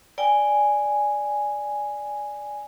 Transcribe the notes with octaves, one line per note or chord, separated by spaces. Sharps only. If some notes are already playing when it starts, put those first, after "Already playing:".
D5 G5 G#5